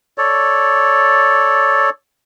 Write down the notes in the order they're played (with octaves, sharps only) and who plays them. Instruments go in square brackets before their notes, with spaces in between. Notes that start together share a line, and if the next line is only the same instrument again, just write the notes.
[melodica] A4 C#5 D5